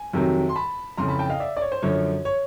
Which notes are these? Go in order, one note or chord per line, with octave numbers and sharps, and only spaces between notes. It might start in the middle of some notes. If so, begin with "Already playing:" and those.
Already playing: G#5
F2 C3 D#3 F#3
C6
A5 B5
F2 C#3 E3 A#5 C6
A5 B5
G5 A5
D#5 F5
D5 E5
D5
C#5
C5
F#2 D3 F3 C#5
C#5